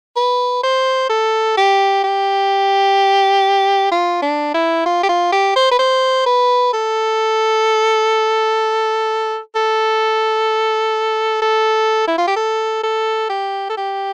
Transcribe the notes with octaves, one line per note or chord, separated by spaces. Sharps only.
B4
C5
A4
G4
G4
F4
D4
E4
F4
G4
F4
G4
C5
B4
C5
B4
A4
A4
A4
E4
F4
G4
A4
A4
G4
A4
G4